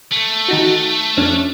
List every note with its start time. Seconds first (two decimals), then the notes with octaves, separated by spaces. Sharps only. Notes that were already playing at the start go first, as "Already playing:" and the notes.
0.12 A3
0.48 D#3 D#4 F#4
1.17 F2 C#4 D4